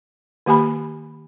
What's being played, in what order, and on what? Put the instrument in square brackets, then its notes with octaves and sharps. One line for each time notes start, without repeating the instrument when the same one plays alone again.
[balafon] D#3 A#3 G4 G#5 B5